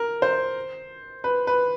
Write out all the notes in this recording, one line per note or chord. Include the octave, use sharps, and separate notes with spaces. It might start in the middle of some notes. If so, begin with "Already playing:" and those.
Already playing: A#4
C5
B4
B4